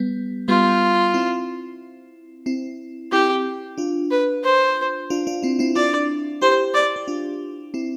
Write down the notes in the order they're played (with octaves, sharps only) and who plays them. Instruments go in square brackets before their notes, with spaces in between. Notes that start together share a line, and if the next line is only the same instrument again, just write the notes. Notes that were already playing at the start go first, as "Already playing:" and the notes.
Already playing: [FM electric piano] G3 B3
[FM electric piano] G3 B3 [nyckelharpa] F4
[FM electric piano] C4 E4
C4 E4
[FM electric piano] C4 E4 [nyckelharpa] G4
[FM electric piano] D4 F4
[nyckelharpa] B4
C5
[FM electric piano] D4 F4
D4 F4
C4 E4
C4 E4
[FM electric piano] D4 F4 [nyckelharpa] D5
[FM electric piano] E4 G4 [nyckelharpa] C5
[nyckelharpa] D5
[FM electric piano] G4
D4 F4
C4 E4